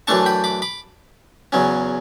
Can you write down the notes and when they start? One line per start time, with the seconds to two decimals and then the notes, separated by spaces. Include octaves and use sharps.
0.07 F#2 E3 A3 D4 A5 C#6
0.26 G5 B5
0.44 B5 D6
0.62 B5 D6
1.52 E2 C#3 F#3 C#4